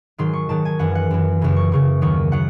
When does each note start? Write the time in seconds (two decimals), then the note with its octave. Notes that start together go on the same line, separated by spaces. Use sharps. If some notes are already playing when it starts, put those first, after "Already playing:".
0.18 G#2 D#3 F#3 C6
0.33 C#6
0.49 G#2 D#3 F#3 A5
0.65 G#5
0.79 F#2 E3 F#5
0.95 F#5
1.11 F#2 E3
1.41 F#2 C#3 E3
1.56 C#6
1.72 F#2 C#3 E3 C#6
2.01 D#2 D#3 F#3 C#6
2.32 D#3 F#3 F#5